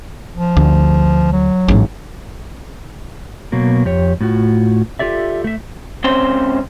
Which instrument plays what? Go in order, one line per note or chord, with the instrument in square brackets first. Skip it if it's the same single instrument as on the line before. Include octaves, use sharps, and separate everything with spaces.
[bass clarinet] F3
[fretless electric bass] D2
[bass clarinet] F#3
[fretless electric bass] A1 G#2
[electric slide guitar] B2 F#3 A#3
F2 G4 C#5
A2 F4 F#4
F4 G4 A4 D5 E5
A3 E5
[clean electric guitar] C#2 C4 C#4 C5 C6